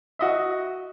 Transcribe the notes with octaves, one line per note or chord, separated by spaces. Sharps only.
F#4 D#5 E5